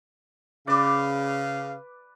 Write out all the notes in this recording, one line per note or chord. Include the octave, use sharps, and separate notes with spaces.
C#3 B4 D5 F5 D6